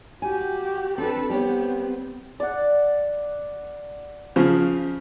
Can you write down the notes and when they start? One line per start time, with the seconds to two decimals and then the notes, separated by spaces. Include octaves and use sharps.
0.22 F#4 G4 G#5
0.98 C4 D4 A4 B4
1.30 G3 B3 C4 G4 C#5
2.40 D5 F#5
4.36 C#3 F3